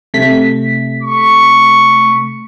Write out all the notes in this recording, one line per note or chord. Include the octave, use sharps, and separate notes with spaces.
C3 A3 B6
C#6